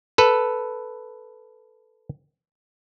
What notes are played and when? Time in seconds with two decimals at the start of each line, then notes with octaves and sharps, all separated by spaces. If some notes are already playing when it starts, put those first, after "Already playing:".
0.18 A4 B4